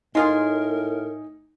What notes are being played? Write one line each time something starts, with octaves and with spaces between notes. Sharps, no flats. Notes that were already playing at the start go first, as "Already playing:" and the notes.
A2 G#3 D#4 F4 G#4 A#4